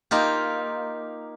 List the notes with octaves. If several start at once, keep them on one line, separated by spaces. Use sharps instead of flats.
A#3 D#4 F4 G4